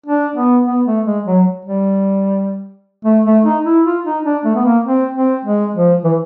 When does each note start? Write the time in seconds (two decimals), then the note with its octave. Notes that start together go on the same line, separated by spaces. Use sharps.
0.06 D4
0.36 B3
0.66 B3
0.86 A3
1.05 G#3
1.26 F#3
1.65 G3
3.05 A3
3.25 A3
3.45 D#4
3.65 E4
3.85 F4
4.05 D#4
4.25 D4
4.45 A3
4.55 B3
4.65 A#3
4.85 C4
5.14 C4
5.45 G#3
5.75 F3
6.05 E3